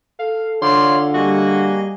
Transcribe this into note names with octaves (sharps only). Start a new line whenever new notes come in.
A4 F5
D3 F4 C#5 D5 F5 C6
G3 A#3 F#4 G#4 D#5